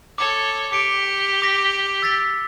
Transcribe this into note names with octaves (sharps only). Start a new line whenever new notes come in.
A4 C#5 D6
G4 D6 C#7 D7
D6 A#6 B6
E6 A6 B6